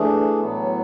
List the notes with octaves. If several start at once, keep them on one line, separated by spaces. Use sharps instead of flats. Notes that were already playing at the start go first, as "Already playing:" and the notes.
Already playing: E3 A3 D4 G#4
A2 F#3 B3